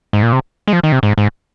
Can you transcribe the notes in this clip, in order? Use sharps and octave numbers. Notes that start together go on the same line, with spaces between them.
G#2
A#2
C3
G#3
F3
D#3
C3
G#2
G#2